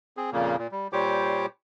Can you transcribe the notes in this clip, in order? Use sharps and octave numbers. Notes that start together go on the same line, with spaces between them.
C4 G#4
F2 A#2 C#3 A#3
A#2
G3
A#2 G3 G4 C5 C#5 D6